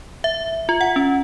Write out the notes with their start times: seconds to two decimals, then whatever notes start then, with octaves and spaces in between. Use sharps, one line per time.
0.24 E5
0.69 F4
0.81 F#5
0.96 C#4